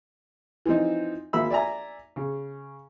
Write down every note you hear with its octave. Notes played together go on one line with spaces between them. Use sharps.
E3 F3 C4 D#4
G#1 A#3 F4 E5 B5 E6
D5 E5 G#5 A#5
C#3